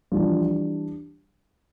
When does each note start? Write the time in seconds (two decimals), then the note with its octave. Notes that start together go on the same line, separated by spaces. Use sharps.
0.12 E3 F3 G3 D4 F4